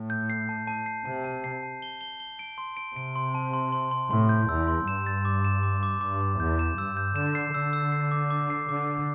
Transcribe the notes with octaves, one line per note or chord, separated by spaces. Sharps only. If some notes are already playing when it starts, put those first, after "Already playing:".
Already playing: A2
G6
C7
A5
A5
C7
C3 A5
A5
C7
A5
G7
G7
G7
D7
C6
D7
C3 D7
C6
A5
C6
C6
C6
A2 C6
G6
E2 E6
C6
G2 E7
A6
D6
E7
D6
D6
G2 D6
D6
E2 G6
E7
G2 E6
G6
D3 E7
C7
D3 E6
E6
C7
D6
D6
C7
D3 D6
C7